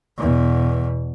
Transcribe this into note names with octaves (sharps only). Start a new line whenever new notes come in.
E2 B2